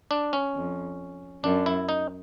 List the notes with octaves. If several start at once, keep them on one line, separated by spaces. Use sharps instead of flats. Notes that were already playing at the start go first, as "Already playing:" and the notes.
D4
C#4
F2
F#2 D4
E4
D#4